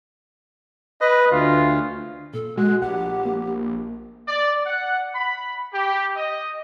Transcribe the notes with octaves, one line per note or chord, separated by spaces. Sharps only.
B4 D#5
D2 F4
A#2 A4
G#3 F#4 F#6
A#1 G4 F#5
A#3
D5
F#5
B5
G4
D#5